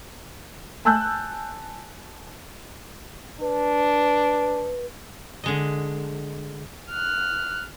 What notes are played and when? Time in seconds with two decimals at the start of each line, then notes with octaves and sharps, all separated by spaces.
0.85 G#5 A5 E6 F#6 G6
3.41 D4 B4
5.44 D3 G#3 D#5
6.90 F6 F#6